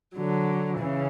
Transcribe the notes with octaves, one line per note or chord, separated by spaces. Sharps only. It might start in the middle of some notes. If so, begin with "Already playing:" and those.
D3 F#3
C#3 E3